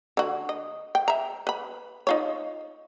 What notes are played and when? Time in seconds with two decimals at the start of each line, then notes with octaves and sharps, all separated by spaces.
0.17 D3 F#4
0.49 D#5
0.95 G5
1.08 E5 A#5
1.47 B4 B5
2.07 D#4 F4 C#5